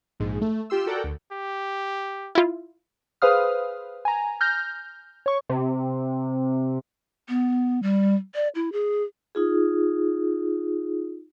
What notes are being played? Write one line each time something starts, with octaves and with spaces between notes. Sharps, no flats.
A#1 G#2 G#3
A3
F4 G4 C6 E6
F#4 A4 A#4 D5 F#5 G5
D2
G4
E4 F4
G#4 B4 C5 F5 D#6 F6
G#5 A#5
F6 G6 A#6
C#5 C#6
C3
B3
G3
D5
E4
G#4
D#4 F4 G#4